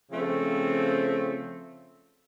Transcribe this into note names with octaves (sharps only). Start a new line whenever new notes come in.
C#3 F3 A3 C4